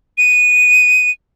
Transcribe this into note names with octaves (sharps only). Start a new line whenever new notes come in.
D#7